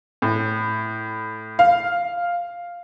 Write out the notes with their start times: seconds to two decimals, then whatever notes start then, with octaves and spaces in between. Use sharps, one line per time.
0.22 A2
1.59 F5